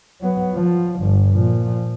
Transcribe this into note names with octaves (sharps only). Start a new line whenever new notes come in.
F#3 B3
F3
G1
A#2 F3